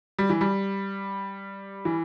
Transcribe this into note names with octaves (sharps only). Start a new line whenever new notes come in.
G3
E3
G3
E3